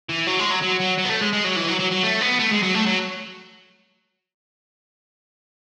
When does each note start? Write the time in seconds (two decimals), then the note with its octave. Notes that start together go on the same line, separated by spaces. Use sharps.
0.09 E3
0.27 F#3
0.39 G#3
0.51 F#3
0.62 F#3
0.80 F#3
0.98 F#3
1.05 B3
1.09 A3
1.21 G#3
1.33 G#3
1.44 F#3
1.56 E3
1.69 F#3
1.80 F#3
1.92 F#3
2.03 A3
2.21 B3
2.39 A3
2.51 G#3
2.63 F#3
2.74 A3
2.86 F#3